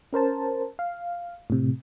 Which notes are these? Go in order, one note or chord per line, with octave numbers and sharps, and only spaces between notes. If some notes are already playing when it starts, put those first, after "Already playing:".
C#4 A#4 C5 A5
F5
A2 C3